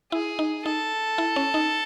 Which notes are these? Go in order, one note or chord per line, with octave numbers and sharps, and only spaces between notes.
E4 G#4
D#4
D#4 A4
E4
C#4
D#4